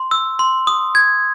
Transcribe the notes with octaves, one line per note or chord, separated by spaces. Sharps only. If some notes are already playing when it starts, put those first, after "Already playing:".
Already playing: C6
E6
C6
D#6
G#6